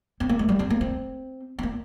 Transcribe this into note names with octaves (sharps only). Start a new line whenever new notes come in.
C4
A#3
G#3
G3
C4
A#3
C4
C4
A#3